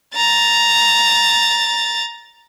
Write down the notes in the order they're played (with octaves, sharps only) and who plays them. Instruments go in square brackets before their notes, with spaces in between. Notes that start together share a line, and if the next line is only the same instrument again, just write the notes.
[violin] A#5 A6